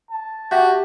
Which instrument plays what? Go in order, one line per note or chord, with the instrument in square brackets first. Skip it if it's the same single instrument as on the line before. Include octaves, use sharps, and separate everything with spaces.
[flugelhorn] A5
[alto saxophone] F#4 [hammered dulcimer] G4 [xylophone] E5 F#5 G6